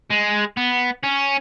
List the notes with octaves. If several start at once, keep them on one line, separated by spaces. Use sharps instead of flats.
G#3
B3
C#4